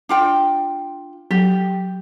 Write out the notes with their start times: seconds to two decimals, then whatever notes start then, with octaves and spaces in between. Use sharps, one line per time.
0.09 D4 F4 G5
1.31 F#3 G4